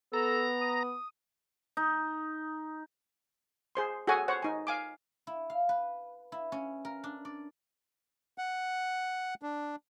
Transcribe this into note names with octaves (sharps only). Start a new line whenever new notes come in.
B3 A4 A#5
D#6
D#4
G#4 C5 C6
F#4 G#4 A4 C#5 F#5 G#5
C5 C#5 F#5
D#4 G#5
F5 G#5 D6
E4
F5
B4
E4
C#4
A#4
D4
D5
F#5
D4